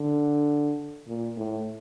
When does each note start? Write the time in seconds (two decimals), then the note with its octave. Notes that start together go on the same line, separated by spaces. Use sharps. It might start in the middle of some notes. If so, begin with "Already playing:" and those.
Already playing: D3
1.08 A#2
1.37 A2